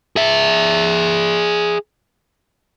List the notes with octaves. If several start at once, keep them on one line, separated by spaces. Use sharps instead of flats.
G#4 E5